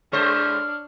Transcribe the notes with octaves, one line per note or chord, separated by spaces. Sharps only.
A2 G#3 D4 C5 C#5 F6